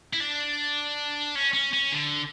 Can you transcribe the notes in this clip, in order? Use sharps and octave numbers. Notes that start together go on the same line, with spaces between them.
E4
D4
C#4
C#4
C#4
D3